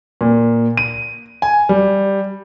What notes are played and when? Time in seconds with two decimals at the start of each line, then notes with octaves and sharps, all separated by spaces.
0.21 A#2
0.77 D#7
1.42 G#5
1.69 G3